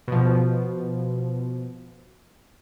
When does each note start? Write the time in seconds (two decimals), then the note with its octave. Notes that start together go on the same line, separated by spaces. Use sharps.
0.08 B2 F3